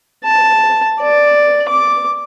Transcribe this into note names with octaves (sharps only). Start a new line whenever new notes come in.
A5
D5
D6